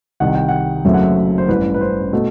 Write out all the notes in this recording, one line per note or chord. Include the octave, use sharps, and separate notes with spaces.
C2 C3 D#3 F#5
G5
F#5
F#1 F#2 F#3 A3 C4 E5
F#5
E5
C5
A1 G2 E3 B4
B4
C5
B2 A3